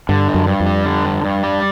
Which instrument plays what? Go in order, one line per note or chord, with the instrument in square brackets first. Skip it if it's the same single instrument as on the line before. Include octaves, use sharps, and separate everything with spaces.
[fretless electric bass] G2 [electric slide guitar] D3
[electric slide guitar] G2
[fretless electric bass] F#2
[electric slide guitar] G2
[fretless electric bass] F2
[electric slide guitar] G3
D3
G2
G2
G3